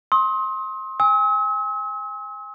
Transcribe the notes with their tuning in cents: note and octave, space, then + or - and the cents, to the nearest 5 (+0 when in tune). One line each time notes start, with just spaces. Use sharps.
C6 +25 D#6 +40
G#5 -25 E6 -45